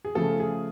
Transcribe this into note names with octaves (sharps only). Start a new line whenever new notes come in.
G#4
C#3 F3 A3 A4
G#4